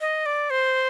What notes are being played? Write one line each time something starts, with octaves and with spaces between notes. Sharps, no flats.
D#5
D5
C5